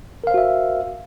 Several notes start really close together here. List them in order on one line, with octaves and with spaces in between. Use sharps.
A#4 F5 C5 F#4 E5